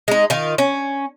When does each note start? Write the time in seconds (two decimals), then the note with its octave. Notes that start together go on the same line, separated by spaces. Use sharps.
0.08 G#3 D#4
0.30 D#3 F4
0.58 C#4